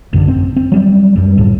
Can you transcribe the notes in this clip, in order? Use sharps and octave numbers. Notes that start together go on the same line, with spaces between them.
A1 F#2 D3
C4
C4
F#3 G3 C4
F#2 G3
C#2 A2